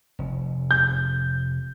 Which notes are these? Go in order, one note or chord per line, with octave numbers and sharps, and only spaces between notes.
F1
G6